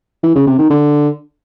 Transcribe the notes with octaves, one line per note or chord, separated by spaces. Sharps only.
E3
C#3
C3
D#3
D3